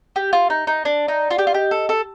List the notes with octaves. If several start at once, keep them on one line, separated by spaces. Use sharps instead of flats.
G4
F4
D#4
D#4
D4 D5
D#4
F4
G4
F4
G4 D#5
A4
A4